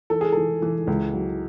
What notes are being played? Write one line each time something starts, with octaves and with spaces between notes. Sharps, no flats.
E3 A4
G#4
E3 A4
E3
C#2
F#3